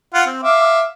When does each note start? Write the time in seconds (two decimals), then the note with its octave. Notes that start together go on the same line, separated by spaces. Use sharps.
0.14 F4 F#5
0.26 C4
0.43 E5 F5 D6